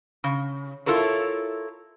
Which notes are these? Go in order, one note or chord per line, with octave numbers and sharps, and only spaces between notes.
C#3
E4 F4 A4 A#4 C#5